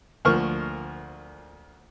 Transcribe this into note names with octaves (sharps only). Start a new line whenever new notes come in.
D2 F3 A#3 A#4 C#6 F6